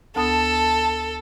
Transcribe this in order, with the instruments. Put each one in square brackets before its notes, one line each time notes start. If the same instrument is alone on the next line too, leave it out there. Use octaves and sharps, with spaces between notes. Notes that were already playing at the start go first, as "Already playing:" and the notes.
[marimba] D2 B3 D#6 [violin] A4 [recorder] A5